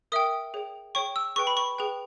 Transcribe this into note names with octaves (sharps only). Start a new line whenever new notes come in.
A#4 E5 G5 D#6
G#4 C#5 G5
G#4 C#5 G5 C#6
E6
G#4 B4 G5 C#6
B5
C#6
G#4 B4 G5